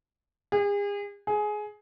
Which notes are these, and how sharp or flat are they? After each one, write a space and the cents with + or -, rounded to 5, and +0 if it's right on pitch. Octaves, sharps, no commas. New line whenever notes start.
G#4 -40
G#4 +15